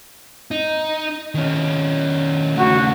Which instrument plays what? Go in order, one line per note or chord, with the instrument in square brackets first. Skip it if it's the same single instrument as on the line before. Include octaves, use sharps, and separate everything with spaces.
[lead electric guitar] D#4
D#3 C#4
[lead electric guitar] C#3 A3 [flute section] F#4